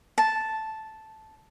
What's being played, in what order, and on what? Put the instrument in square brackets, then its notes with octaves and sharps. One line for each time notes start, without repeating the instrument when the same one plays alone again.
[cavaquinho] A5